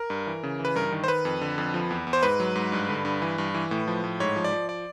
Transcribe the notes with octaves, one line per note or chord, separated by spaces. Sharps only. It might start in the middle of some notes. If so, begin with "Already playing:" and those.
Already playing: A#4
G2
E3
C#3
E3
B4
G2 A#4
D#3
C5
D#3 B4
F2
D3
F2
F3
E2
E2
C5
G#2 B4
F#3
G#2
G2
D3
G2
E3
G2
E3
A2
F3
A2
G#2 C#5
F3
D5
F3
D5